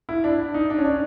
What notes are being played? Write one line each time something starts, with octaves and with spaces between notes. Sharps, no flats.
E4
D4
D#4
D4
C#4
D4